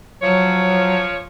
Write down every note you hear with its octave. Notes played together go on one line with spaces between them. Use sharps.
F3 F#3 C#5